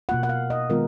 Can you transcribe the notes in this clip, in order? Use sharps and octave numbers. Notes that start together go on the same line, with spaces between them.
B2 A#3 F4 F#5
F#5
F5
D#5
D#3 G#3 B3 F4 A#4